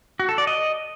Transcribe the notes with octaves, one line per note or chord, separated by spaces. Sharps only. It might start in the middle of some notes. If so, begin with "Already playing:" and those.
F#4
A4
D5
D#5